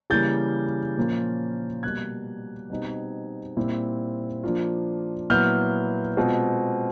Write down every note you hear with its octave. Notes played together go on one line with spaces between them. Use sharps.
C#3 E3 G3 A#3 G6 A6
A#2 F3 A#3 C#4 F4
B2 G3 A#3 F#6 G#6
B2 G3 C4 D#4
A#2 G3 C4 E4
F3 A#3 D4 F4
A#2 F#3 B3 E4 F6 G6
B2 G#3 C4 F4